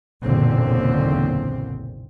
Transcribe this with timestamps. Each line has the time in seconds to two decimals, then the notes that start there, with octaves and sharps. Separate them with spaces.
0.23 F#1 B1 E2 A#2 D3 C4